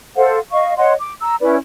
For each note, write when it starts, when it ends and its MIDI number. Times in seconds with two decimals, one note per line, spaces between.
0.16 0.39 69
0.16 0.39 72
0.16 0.39 77
0.16 0.39 78
0.51 0.74 75
0.51 0.74 77
0.51 0.74 85
0.77 0.93 73
0.77 0.93 75
0.77 0.93 78
0.77 0.93 84
0.99 1.13 86
1.21 1.35 82
1.21 1.35 88
1.40 1.56 61
1.40 1.56 64
1.40 1.56 71
1.40 1.56 74